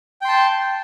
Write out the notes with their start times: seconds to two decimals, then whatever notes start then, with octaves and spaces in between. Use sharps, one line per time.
0.22 G5
0.25 C6
0.28 A5